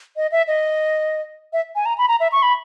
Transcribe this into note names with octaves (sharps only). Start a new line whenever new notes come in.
D#5
E5
D#5
E5
G#5
A#5
B5
A#5
E5
C#6
B5